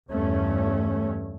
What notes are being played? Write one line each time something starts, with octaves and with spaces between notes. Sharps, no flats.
E2 G2 A3 C#4